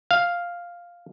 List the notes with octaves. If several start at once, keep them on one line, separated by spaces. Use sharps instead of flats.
F5